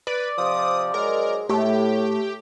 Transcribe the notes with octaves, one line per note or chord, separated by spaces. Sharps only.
B4 D5
C3 F3 D#6
G#2 F#3 G#3 A#4
A2 A3 G4